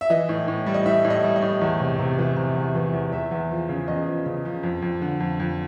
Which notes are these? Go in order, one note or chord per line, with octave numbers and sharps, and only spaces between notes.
E5
E3 D#5
A2
A2
G3
D#5
A2 E5
A2
D#5
G3
D#5
A2
E2
C3
C3
E3
C3
E2
E3
E2
E2 E5
E2
F3
C#3
E2 D#5
F3
C#3
F3
F2
F2
D3
F2
F2